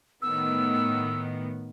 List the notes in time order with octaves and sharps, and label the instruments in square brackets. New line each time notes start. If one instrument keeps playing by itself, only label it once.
[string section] A2 D#3 B3 [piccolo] E6